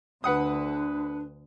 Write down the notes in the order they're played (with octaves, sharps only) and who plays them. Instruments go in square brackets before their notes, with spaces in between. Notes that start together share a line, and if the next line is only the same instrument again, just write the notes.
[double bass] D2 D3 [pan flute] D4 [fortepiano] B4 F#5 D#6